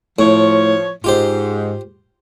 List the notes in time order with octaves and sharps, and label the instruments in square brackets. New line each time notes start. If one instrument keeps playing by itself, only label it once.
[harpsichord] A2 [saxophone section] F3 C#5
[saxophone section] G#2 [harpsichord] F4 G4 C5